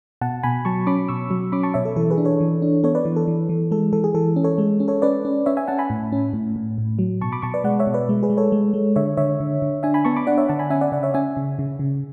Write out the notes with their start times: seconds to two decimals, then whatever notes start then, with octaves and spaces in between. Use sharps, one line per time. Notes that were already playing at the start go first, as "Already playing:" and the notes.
0.21 B2 F#5 A5
0.43 B2 G#5 B5
0.65 F#3 A5 C#6
0.87 C#4 B5 D6
1.09 B2 C#6 E6
1.30 F#3
1.52 C#4 B5 D6
1.63 A5 C#6
1.74 B2 C#5 E5
1.85 A4
1.96 E3 A4
2.10 G#4 B4
2.18 D4
2.25 A4 C#5
2.41 E3
2.62 D4
2.83 B3 A4 C#5
2.95 B4 D5
3.05 E3
3.16 A4
3.28 E3
3.49 E3
3.71 G#3 A4
3.93 E3 A4
4.04 G#4
4.14 E3 A4
4.36 C#4
4.44 A4 C#5
4.58 G#3
4.80 C#4
4.88 A4 C#5
5.02 C#4 B4 D5
5.25 C#4
5.46 C#4 C#5 E5
5.57 E5 G#5
5.67 C#4 F#5 A5
5.78 G#5 B5
5.90 A2
6.12 C#4
6.33 A2
6.56 A2
6.78 A2
6.99 F#3
7.21 B2 A5 C#6
7.32 B5 D6
7.42 B2 A5 C#6
7.54 B4 D5
7.64 G#3 D5 F#5
7.79 C#5 E5
7.87 B2
7.94 B4 D5
8.09 G#3
8.23 G#4 B4
8.30 G#3
8.37 A4 C#5
8.52 G#3
8.74 G#3
8.96 D3 C#5 E5
9.17 D3 C#5 E5
9.40 D3
9.62 D3
9.83 D4 E5 G#5
9.94 G#5 B5
10.05 B3 A5 C#6
10.16 B5 D6
10.27 D4 D5 F#5
10.38 C#5 E5
10.49 D3 F#5 A5
10.59 G#5 B5
10.70 C#4 E5 G#5
10.81 D5 F#5
10.92 C#3 D5 F#5
11.03 C#5 E5
11.14 C#4 E5 G#5
11.37 C#3
11.59 C#3
11.79 C#3